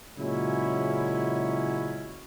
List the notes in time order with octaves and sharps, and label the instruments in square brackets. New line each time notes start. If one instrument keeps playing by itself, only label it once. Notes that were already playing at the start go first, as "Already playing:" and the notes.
[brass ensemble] A#2 C#3 F#3 G#3 C#4 E4